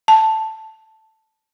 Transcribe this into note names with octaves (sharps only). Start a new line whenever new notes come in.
A5